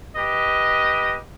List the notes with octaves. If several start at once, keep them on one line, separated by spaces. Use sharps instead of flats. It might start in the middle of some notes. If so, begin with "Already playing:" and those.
G4 B4 D#5